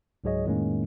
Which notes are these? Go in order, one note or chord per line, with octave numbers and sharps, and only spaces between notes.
C#2 G#2 F#3 G#4 C#5 D#5
F2 A2 D#3 G#3 A#3 C#4